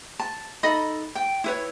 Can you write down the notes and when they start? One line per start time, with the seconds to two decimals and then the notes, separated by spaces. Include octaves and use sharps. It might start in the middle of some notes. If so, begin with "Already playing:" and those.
0.19 A5
0.63 D#4 A4 D#5 B5
1.15 G5
1.44 E4 B4 C#5